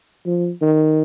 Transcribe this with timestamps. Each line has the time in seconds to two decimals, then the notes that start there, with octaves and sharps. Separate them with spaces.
0.25 F3
0.61 D#3